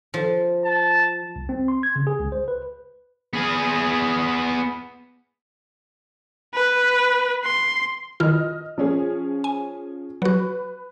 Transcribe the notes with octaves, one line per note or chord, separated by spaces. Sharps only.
F3
A5
C2
C4
C6
G#6
C#3
G#4
C#2
C5
B4
B3 G#4
B4
C6
D#3 E4 F4 D#5 F6
F3 C#4 G#4
G#5
F#3 F#4 B4